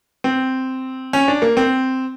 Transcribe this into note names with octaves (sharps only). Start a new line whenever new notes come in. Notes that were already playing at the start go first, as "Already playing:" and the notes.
C4
C#4
D4
A#3
C4